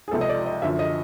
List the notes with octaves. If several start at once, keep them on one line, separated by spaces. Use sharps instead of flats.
G#4
C#2 C3 F3 A4
D#5
D5
D#5
F#2 D3 F3 E5
D#5